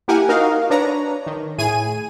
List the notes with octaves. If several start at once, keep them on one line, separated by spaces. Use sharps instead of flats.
A#3 E4 G4 A#4 F#5 G#5
D#4 F#4 A#4 D#5 F5
D4 B4 C#5 A#5
D#3
A2 G#4 G#5 D#7